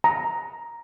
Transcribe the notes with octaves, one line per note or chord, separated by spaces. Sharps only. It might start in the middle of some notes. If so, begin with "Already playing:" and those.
A#5